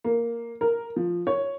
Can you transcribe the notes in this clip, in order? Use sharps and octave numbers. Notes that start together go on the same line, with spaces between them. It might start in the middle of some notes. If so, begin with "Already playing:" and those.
A#3
A#4
F3
C#5